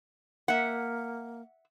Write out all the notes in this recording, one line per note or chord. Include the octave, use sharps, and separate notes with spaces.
A#3 E5 F#5